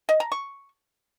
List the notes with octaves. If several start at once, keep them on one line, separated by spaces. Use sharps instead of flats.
D#5
A#5
C#6